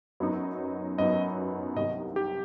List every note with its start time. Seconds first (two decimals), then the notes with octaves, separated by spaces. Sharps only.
0.20 F#2 F#3 B3 D#4
0.98 F#2 F#3 B3 D#4 D#5
1.76 C2 C3 D#3 D#5
2.16 G4